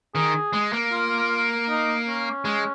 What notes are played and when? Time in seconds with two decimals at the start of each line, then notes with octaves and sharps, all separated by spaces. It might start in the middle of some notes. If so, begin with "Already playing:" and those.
0.15 D#3 G#4
0.53 G#3
0.73 A#3
0.92 F4
1.69 D#4
2.08 C#4
2.45 G#3